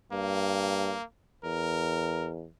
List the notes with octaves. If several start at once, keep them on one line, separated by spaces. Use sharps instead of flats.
G2 A#3
E2 A#4